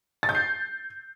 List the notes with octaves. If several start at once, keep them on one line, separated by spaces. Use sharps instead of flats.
A6
G6
C7